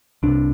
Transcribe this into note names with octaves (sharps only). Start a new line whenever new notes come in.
C2 C3 D4